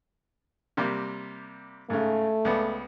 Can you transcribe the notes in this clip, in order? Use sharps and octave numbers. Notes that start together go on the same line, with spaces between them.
C3 G3 A#3
G#2 C#3 A3
C#2 B3 D5